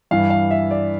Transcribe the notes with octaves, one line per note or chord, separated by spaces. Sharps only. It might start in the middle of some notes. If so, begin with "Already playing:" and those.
G2 E3 F5
F5
E5
D5